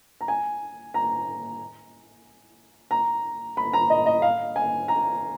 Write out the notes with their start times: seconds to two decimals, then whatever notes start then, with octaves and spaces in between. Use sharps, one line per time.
0.21 A#5
0.28 G#5
0.94 A#5
2.91 A#5
3.57 B5
3.73 A#5
3.90 D#5
4.06 D#5
4.22 F5
4.56 G#5
4.88 A#5